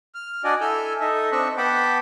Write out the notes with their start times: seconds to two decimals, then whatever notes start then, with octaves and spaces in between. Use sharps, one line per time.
0.15 F6
0.44 D4 F#4 D5 D#5 G#5
0.61 E4 A4 G#5 E6 F6 G6
1.00 D#4 A4 D#5 E5
1.32 C4 D4 D#5 C#6 E6 F#6
1.58 B3 F#5 G5 A5 B5 D6